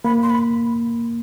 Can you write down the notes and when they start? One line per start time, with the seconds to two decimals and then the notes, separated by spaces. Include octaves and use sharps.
0.05 A#3 B5
0.23 C6
0.30 B5